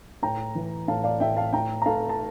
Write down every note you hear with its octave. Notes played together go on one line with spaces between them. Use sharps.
A2 G5 A#5
E3
A2 F5 A5
D5 F5
A2 E5 G5
F5 A5
A2 G5 A#5
A#5
A3 F5 A5
A5